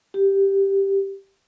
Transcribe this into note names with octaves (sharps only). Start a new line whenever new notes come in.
G4